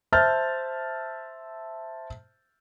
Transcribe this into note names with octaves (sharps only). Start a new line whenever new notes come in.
C5 E5 A5 F6 G6 A6